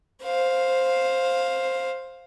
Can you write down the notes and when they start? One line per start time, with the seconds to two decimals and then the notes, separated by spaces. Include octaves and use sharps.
0.24 C5 F5